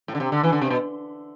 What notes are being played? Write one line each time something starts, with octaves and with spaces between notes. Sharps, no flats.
A2
D3
C3
D3
E3
D3
C3
B2